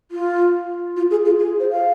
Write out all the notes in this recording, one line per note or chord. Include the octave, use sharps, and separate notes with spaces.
F4
F4
G#4
F4
G#4
C5
F5